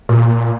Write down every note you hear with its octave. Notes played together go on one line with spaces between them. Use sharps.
A#2